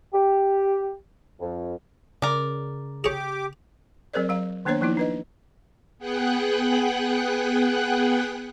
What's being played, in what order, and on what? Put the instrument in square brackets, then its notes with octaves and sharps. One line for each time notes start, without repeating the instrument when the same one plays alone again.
[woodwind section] G4
F2
[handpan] C#3 [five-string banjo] A#4 D5
[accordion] G4 D6 [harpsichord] G#4 C#5
[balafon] F#3 C4 G#4 A#4 C5 D5
F#3 F5 A#5
D#3 A#3 B3 D4 C5 C#5
F3 A#3 B3 D#4 E4
D4 B4 D#5
[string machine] B3 G#4 F#5 G5 F#6